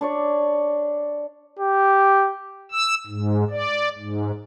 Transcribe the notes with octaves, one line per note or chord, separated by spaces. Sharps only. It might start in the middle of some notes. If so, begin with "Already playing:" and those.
D4 C#5 D5
G4
E6
G#2
D5
G#2